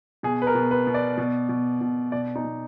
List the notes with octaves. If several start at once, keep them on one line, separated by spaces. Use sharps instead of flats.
B2 G#4
B4
A#4
B2
B4
B2
D5
B2
B2
B2
B2 D5
D#4
B2